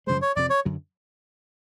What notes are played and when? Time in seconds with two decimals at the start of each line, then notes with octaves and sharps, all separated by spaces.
0.07 F#2 C#3 F3 G#3 C5
0.22 C#5
0.36 F2 C3 F3 D5
0.50 C#5
0.65 F#2 D3 F#3